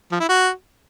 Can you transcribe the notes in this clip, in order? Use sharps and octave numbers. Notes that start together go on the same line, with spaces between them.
F3
E4
F#4